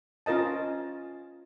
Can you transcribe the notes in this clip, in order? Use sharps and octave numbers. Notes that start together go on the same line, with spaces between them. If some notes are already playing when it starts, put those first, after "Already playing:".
C#4 F4 A#4 D#5 A5